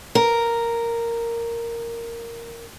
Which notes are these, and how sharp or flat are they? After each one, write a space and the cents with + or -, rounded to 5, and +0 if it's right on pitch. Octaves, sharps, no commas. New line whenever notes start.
A#4 -5